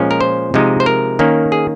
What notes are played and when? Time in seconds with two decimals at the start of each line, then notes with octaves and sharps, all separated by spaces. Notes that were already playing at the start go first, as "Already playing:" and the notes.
Already playing: A#2 F3 G#3 C#4
0.11 A#4
0.21 C5
0.54 C3 F3 G#3 D#4
0.80 C5
0.86 A#4
1.19 D#3 A#3 C#4
1.52 G#4